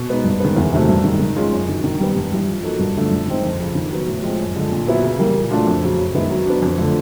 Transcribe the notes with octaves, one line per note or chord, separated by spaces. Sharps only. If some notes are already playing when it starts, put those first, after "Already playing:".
Already playing: B2
G#3 B3 D#4
G2
D#3 G#3 B3
E2
C3 D#3 F#3 A3
G2
D#3 G#3
D#3
G#3 C#4 F4 G#4
F#2
D#3 F#3
D#3
G3 B3
G2
E3 G3
F3
A#3 D#4 F#4 A4
G2
D3 F3 A3 D4
G2
D#3 G#3 C4 D#4
F2
C#3 F3
D#3
F#3 B3
A2
F3 G#3 C4
F#2
D3 F3 G#3
A#2
F#3 B3 E4
C#3
E3 G3 A#3
A#2
F#3 A3 D4 F4
F2
C#3 F#3
F#2
D#3 G#3 B3 E4
F#3
B3 D4
F2
D3 F3 A3